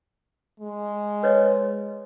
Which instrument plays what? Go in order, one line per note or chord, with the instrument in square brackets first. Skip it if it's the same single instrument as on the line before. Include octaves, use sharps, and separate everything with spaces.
[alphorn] G#3
[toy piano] B4 C#5 D#5